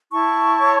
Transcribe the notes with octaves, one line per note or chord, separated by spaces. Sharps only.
E4 A5 C#6
C#5